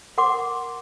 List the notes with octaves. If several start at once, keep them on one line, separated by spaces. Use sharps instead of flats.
A#4 F#5 C6 D6